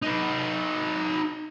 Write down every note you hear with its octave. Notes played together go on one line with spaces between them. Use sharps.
D#4 B4